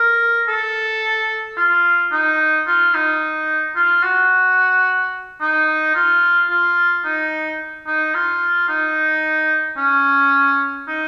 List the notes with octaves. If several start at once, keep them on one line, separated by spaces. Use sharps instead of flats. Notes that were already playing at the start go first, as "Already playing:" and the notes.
Already playing: A#4
A4
F4
D#4
F4
D#4
F4
F#4
D#4
F4
F4
D#4
D#4
F4
D#4
C#4
D#4